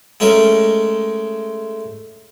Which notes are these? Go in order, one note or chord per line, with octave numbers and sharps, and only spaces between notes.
G#3 A3 C#4 A#4 D#5